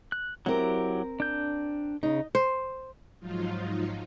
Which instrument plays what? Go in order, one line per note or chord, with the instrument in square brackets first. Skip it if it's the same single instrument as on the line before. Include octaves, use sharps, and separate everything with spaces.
[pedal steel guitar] F#6
[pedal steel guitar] F#3 E4 G4 [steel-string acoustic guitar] C4 A#4
[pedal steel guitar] D4 G6
[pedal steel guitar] C#3 [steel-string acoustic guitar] D#4
[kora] C5
[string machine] G#2 F3 F#3 D#4 F4